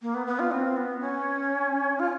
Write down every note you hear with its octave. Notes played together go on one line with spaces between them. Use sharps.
A#3
B3
B3
F4
C4
B3
C#4
F4